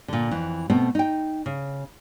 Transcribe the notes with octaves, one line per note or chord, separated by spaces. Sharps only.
A#2 D3
F2 E3
B2 A3 B3 C4
D#4 G5
C#3